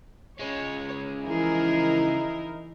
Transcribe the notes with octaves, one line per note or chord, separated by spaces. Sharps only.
C#3 G#3 C#5
E3 F3 D#4 E4 G#4 A#4